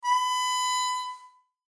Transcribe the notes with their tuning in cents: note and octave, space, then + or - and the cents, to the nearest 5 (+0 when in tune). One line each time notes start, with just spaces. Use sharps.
B5 +25